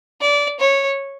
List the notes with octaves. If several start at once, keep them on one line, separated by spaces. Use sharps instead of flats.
D5
C#5